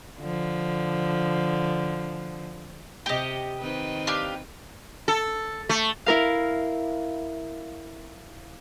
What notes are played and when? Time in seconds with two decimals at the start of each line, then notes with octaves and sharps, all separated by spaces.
0.19 D3 F3
3.06 C3 G4 D#5
3.60 D#3 C4 B4
4.07 D4 G4 F5
5.08 A4
5.69 A3
6.06 E4 A#4 F5